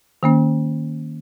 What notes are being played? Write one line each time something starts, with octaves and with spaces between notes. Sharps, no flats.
D#3 A#3 C#4